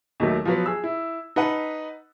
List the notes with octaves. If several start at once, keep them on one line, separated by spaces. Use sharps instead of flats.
D#2 D#3 F#3 A3
F3 F#3 B3
G#4 E6
E4
D#4 B4 F#5 A5